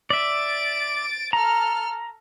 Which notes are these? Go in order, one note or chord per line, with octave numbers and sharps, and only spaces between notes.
D5 E5 A6 D7
A4 A#5 F6